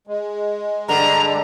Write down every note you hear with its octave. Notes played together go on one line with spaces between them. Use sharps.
G#3
G2 D3 A#5